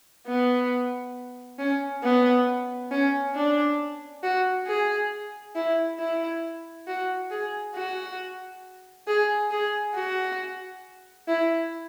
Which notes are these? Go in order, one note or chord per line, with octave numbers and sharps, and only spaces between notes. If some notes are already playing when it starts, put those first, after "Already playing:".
B3
C#4
B3
C#4
D4
F#4
G#4
E4
E4
F#4
G#4
F#4
G#4
G#4
F#4
E4